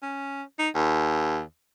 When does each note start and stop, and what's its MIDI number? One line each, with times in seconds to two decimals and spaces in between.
0.03 0.43 61
0.59 0.69 63
0.75 1.42 39